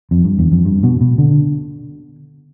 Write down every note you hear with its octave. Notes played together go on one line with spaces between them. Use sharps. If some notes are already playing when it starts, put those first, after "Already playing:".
F2
G2
E2
F2
G2
B2
B2
D3